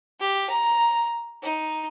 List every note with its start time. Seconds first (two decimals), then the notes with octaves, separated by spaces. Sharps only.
0.20 G4
0.49 A#5
1.43 D#4